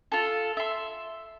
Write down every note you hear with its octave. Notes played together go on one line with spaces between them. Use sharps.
F4 A4
E5 C6